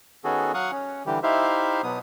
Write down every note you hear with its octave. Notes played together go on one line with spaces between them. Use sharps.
D#3 B3 C#4 F#4 G#4 A4
F#3 F5 F#5 C#6 D#6
C#4
D3 E3 G3 G4
D#4 E4 G4 C5 E5 F5
B2 F#3 B3 D#6